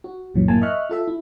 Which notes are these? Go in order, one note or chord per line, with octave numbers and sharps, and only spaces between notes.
F#4
C#2 F#2 A#2 D3 E3 F#3
A1 F#2 A#3 E4 G#5 A5
D#5 E5 C#6 F6 F#6
F4 A4 E5
E4